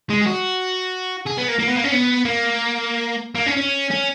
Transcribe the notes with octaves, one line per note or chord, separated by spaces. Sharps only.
G#3
G#4
F#4
G#4
B3
A#3
A#3
B3
A#3
C#4
B3
A#3
A#3
C#4
C#4
C#4